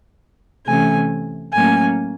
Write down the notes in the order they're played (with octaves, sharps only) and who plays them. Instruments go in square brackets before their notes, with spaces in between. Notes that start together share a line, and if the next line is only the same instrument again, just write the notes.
[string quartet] C3 E3 A3 C#4 G#5
A2 F#3 A#3 C#4 G#5